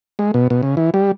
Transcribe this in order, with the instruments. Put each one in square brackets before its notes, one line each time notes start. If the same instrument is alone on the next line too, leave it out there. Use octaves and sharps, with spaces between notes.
[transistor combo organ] G#3
B2
B2
C#3
E3
G3